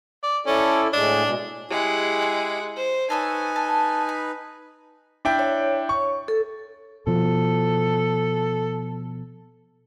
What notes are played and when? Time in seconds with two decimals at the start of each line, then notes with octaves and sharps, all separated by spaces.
0.23 D5
0.47 C#4 E4 A4 D5
0.93 A2 G#3 D4
1.25 B2 G#3
1.70 G#3 E4 G4 G#4 F#5
2.22 C6
2.76 C5
3.10 D#4 A4 B4 C#5 G#5 E6
3.56 A4
4.09 B5
5.25 D4 E4 G5
5.39 C#5
5.89 C#6
6.28 A4
7.07 B2 F3 A4